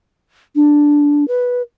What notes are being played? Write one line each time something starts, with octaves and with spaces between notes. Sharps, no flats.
D4
B4